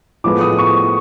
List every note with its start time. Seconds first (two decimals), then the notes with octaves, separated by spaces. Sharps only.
0.24 A2 F3 G#3 B3 D6
0.41 D#6
0.59 C#6